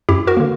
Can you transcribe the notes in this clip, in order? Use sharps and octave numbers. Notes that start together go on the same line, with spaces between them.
F#2 E4 G4
F#4 A#4
D3 A#3